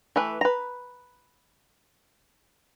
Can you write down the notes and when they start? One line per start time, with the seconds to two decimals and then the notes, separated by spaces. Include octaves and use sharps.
0.16 E3 A3 B4
0.41 B4 A#5